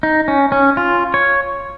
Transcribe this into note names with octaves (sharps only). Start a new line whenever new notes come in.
D#4
C#4
C#4
F4
C#5